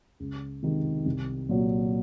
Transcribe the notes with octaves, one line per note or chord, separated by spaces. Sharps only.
C#2
C3 D#3 G#3
C2
A#2 F#3